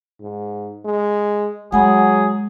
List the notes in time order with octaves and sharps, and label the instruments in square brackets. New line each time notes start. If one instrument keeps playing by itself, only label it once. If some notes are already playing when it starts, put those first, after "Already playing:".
[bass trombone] G#2
G#3
[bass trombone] F#3 [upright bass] G#3 [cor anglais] G#4 [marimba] F#5 G#5 B5